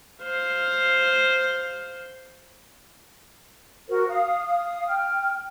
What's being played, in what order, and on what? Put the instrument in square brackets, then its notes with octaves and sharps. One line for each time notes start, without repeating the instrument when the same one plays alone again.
[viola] C5 F5
[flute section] F#4 A#4 C5
F5 D#6
F5 D#6
G5 F6